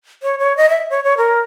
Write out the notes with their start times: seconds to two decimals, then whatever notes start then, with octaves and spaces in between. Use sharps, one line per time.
0.23 C#5
0.39 C#5
0.57 D#5
0.70 E5
0.90 C#5
1.04 C#5
1.17 A#4